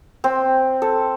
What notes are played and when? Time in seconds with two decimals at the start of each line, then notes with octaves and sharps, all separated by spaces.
0.24 C4
0.82 A4